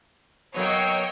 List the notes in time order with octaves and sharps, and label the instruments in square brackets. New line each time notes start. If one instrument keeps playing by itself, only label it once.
[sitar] B2 F#3 A#3 [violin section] C#5 D#5 G5